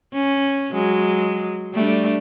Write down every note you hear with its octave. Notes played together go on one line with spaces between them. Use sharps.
C#4
F#3 G#3
G3 A3 D4